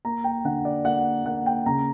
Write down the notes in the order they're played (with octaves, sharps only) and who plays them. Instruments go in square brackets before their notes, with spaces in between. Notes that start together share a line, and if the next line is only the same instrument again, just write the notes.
[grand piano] A#3 A#5
G5
D3 F#5
D5
A#3 F#5
A#3 F#5
G5
C#3 A#5